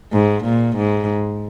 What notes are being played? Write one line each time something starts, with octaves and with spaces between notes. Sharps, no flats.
G#2
A#2
G#2